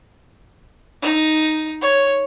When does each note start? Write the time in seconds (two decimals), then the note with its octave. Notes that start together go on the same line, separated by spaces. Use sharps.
1.02 D#4
1.81 C#5